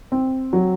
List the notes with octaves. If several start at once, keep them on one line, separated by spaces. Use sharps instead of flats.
C4
F#3